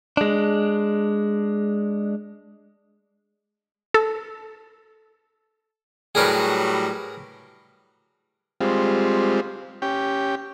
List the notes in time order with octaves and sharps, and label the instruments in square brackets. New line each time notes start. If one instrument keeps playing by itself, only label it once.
[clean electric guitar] G#3 D4
[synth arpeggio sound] A4
[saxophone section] A2 F#3 G3 [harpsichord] G#4 A#4 B4
[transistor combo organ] G3 G#3 C4 F4
C#4 G4 G5